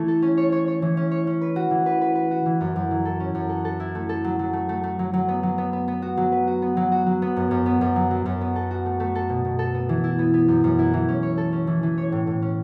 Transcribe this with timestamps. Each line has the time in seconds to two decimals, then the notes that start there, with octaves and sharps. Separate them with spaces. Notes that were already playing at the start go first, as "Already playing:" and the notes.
Already playing: E3 A3 E4
0.08 A4
0.22 C#4
0.38 C#5
0.52 C#5
0.68 C#5
0.82 E3
0.97 C#4
1.11 C#5
1.27 C#4
1.41 B4
1.56 F#4
1.71 E3
1.86 B4
2.01 B4
2.15 B4
2.31 F#4
2.46 E3
2.61 F#2
2.76 F#2
2.91 E3
3.05 A4
3.20 C#4
3.35 F#2
3.49 A4
3.65 A4
3.80 E4
3.95 A3
4.09 A4
4.24 F#3
4.39 F#3
4.53 A3
4.69 A3
4.84 A3
4.99 F#3
5.14 F#3
5.28 B3
5.43 F#3
5.58 B3
5.73 B3
5.88 B3
6.02 F#4
6.17 F#3
6.32 B4
6.47 F#4
6.62 B3
6.77 F#3
6.92 F#4
7.06 F#3
7.22 B3
7.36 F#2
7.51 F#2
7.66 B3
7.81 F#2
7.96 F#3
8.11 F#3
8.26 F#2
8.41 B3
8.56 A4
8.71 F#4
8.86 A3
9.00 A3
9.15 A4
9.30 B2
9.45 B2
9.59 A4
9.74 B3
9.89 E3
10.04 E4
10.19 B3
10.34 B3
10.48 F#2
10.64 F#2
10.79 E4
10.94 E3
11.09 C#4
11.23 C#5
11.38 A4
11.53 C#4
11.67 E3
11.83 E3
11.98 C#5
12.12 A2
12.27 A2
12.42 C#4